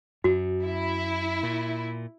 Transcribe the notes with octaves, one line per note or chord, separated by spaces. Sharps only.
F#2 F#4
E4
A#2